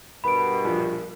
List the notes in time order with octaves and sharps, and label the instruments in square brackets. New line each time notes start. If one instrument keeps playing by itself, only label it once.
[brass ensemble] G2 B2 [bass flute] A#4 [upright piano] B4 [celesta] B5 D7
[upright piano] A#1 F3